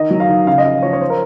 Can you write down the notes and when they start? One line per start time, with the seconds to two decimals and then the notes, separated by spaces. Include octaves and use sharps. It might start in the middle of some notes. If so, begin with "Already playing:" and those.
Already playing: D#3 D#5
0.10 F#3
0.20 F5
0.29 D#3
0.47 C#3 F5
0.58 D#5
0.65 F3 F5
0.83 F3 C#5
0.93 C#5
1.01 C5
1.10 A#4